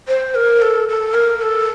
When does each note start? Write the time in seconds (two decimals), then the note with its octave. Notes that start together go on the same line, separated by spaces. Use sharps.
0.08 C5
0.35 A#4
0.62 A4
0.89 A4
1.14 A#4
1.41 A4